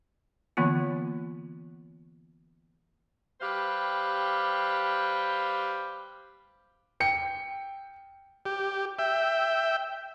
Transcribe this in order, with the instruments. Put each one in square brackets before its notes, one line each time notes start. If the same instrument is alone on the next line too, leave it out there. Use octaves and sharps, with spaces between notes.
[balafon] D3 E3 A#3 B3 F4
[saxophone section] G3 G4 B4 C5 F5
[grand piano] G5 C#7
[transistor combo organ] G4
E5 G5